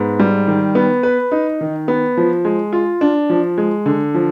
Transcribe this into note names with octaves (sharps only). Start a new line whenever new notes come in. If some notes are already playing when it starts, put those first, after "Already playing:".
Already playing: G#2 B3
G3
D#3
B3
B4
D#4
D#3
B3
F3
G#3
F4
D4
F3
G#3
D3
F3